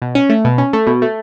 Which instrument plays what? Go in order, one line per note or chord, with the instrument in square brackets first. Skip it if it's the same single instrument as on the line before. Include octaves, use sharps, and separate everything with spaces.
[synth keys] B2
C#4
A3
B2
C#4
A3
B2
A3